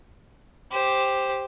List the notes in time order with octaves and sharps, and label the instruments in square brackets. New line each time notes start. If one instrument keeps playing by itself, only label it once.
[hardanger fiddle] G4 C5